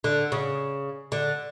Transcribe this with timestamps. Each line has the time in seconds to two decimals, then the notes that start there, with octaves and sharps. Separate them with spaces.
0.04 D3
0.32 C#3
1.12 D3